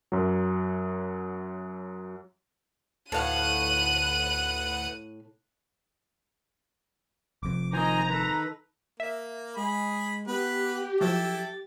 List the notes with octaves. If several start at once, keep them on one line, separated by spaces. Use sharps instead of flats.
F#2 F#3
D2 A2 B4 F5 F#5 F#6 D#7
F1 F2 D6
D#3 F3 C5 D#5 G#5 A#5
D#3 A4 B4
A#3 E5
G#3 G#4 B5
B3 G4 B4
F3 F#3 E4 A4 G5 A6